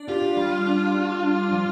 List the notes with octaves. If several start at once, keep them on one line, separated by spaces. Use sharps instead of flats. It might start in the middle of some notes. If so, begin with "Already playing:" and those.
Already playing: D4 D5
F4 G4
G3
D4
D4
D4
F3